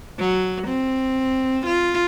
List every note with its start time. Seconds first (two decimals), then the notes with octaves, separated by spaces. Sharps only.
0.19 F#3
0.67 C4
1.66 F4